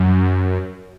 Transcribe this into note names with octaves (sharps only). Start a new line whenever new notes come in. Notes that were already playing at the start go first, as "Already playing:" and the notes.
Already playing: F#2